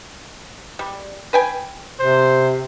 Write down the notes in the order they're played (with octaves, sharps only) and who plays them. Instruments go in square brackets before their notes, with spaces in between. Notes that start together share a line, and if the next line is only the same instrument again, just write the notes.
[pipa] G3
B4 G5 G#5
[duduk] C3 [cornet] C5